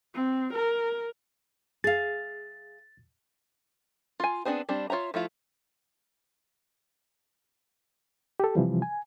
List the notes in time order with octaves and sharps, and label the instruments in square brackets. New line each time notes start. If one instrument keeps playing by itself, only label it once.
[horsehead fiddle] C4
A#4
[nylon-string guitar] G#4 F5 [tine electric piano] A6
[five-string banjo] F4 G#5
B3 C4 D4 G#4 C5
G3 C4 D4
F4 C#5 E5 A#5
F3 A3 E4 F4
[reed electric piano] G4 A4
C3 E3 F3 G3
G#5